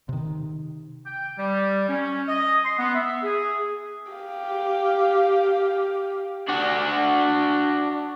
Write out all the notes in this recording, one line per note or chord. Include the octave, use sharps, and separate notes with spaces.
C3 D#3
G5
G3
C#4
D#5
C6
B3
E5
G#4
G4 F5
D4 F#4